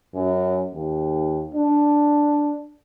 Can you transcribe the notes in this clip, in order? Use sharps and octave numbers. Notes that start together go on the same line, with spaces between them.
F#2
D#2
D4